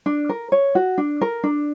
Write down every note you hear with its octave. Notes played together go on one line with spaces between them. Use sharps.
D4
A#4
C#5
F#4
D4
A#4
D4